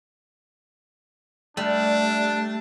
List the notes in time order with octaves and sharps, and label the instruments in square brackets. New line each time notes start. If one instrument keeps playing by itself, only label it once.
[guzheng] G3 [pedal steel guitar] A3 [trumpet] D4